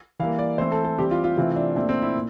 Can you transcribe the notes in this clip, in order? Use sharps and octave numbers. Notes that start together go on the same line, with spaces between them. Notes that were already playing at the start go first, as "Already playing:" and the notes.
E3 G3 A#3 F5
D5
E3 A3 C4 C5
A4
A4
E3 G3 C4 G4
F4
F4
C3 E3 A3 C4 F4
D4
A#2 A3 C4 D4
C4
E4
A#2